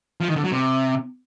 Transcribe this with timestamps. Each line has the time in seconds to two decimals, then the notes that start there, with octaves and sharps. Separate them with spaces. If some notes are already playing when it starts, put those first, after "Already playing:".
0.20 F3
0.28 D#3
0.36 D3
0.44 F#3
0.52 C3